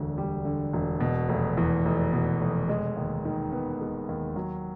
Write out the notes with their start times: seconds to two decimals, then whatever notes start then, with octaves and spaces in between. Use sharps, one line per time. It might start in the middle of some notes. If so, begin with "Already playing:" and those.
Already playing: E1 D2 D3
0.18 G3
0.45 D3
0.73 E1
1.00 B2
1.29 F1
1.57 E2
1.85 F1
2.13 B2
2.41 F1
2.69 G#3
2.97 D#2
3.25 D#3
3.52 B3
3.81 G#3
4.09 D#2
4.36 F#3